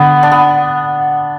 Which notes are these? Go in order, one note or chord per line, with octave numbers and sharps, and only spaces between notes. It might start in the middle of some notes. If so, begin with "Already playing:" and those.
Already playing: D3 B3
D4
B3